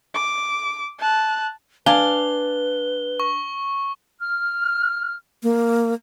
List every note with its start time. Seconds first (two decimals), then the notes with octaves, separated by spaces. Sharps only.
0.14 D6
0.99 A5 F#6
1.86 D4 B4 F5 G#5 G7
3.20 C#6
4.20 F6
5.43 A#3